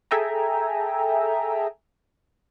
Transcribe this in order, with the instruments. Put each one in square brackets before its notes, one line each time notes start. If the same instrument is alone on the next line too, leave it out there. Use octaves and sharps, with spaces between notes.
[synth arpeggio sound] G#4 A4 E5 G5 G#5 A#5